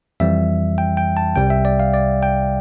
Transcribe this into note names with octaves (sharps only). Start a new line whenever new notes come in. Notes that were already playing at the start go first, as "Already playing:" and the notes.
F2 E3 G3 E5
G5
G5
A5
C2 C3 G3 G5
E5
D5
F5
D5
G5